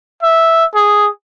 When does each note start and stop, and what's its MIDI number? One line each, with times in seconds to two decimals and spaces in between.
0.23 0.64 76
0.75 1.09 68